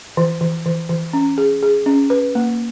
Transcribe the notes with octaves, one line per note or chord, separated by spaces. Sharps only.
E3
E3
E3
E3
C#4
G#4
G#4
C#4
B4
A#3